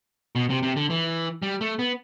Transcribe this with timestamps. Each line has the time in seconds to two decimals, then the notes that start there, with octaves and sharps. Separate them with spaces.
0.36 B2
0.50 C3
0.63 C3
0.76 D3
0.90 E3
1.42 G3
1.61 A3
1.79 B3